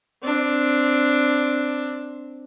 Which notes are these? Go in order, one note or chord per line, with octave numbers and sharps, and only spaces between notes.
C4 D4